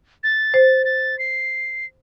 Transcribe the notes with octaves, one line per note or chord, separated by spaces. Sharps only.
A6
C5
A6
C7